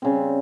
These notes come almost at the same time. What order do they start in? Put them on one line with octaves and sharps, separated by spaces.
C4 C#3 G3